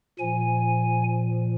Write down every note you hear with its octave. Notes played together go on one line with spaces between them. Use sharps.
A#2 F3 G#5